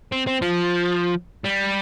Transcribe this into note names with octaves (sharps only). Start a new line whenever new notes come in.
C4
C4
F3
G3